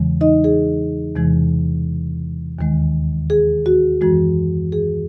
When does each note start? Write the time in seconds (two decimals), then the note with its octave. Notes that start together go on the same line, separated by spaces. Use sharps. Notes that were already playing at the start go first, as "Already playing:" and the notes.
Already playing: E2 C#3 E3 G#3
0.21 D#4 D#5
0.44 G#4
1.15 E2 C3 E3 G#3
2.59 D#2 D#3 G#3
3.30 G#4
3.66 F#4
4.01 F#2 E3 G#3 F#4
4.72 G#4